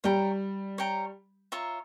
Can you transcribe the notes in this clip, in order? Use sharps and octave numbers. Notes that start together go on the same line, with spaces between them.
G3 C#5 G5 A#5
C#5 G5 A#5
F4 C#5 E5 A#5